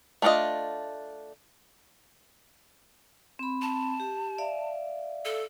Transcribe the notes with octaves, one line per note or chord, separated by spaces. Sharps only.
A3 C#4 D4 F4 D#5
C4 B5
A5
G4
D5 E5 F5
A4